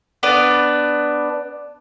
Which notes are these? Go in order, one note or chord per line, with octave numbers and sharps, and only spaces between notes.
B3 D4 B4